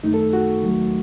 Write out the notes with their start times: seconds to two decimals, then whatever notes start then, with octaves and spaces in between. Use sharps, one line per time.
0.03 F#2 D#3 A3 D#4
0.14 A4
0.33 F#4
0.62 D#2 D#3 F#3 A3